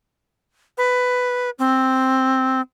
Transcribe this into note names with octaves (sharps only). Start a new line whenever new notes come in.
B4
C4